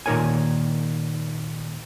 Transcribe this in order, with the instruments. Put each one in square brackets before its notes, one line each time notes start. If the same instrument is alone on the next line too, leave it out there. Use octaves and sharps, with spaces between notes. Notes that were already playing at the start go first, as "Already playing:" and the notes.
[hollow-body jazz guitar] A#2 D#3 D#4 A#4 C#5 G#5